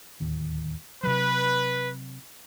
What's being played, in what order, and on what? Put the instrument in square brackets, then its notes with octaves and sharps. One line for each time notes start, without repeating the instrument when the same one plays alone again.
[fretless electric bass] D1 D#2
[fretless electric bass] C3 F#3 [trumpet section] B4